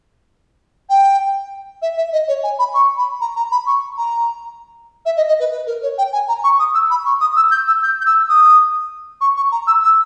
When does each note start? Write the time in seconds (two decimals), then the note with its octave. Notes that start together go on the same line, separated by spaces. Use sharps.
0.89 G5
1.82 E5
1.97 E5
2.12 D#5
2.28 C#5
2.43 G#5
2.59 B5
2.74 C#6
2.97 B5
3.21 A#5
3.36 A#5
3.51 B5
3.66 C#6
3.97 A#5
5.05 E5
5.16 D#5
5.28 D#5
5.39 B4
5.52 B4
5.66 A#4
5.82 C#5
5.98 G5
6.12 G#5
6.28 A#5
6.43 C#6
6.59 D#6
6.74 E6
6.90 B5
7.05 C#6
7.21 D#6
7.36 E6
7.51 G6
7.67 E6
7.82 G6
8.01 G6
8.05 E6
8.29 D#6
9.21 C#6
9.37 C#6
9.51 A#5
9.67 E6
9.83 E6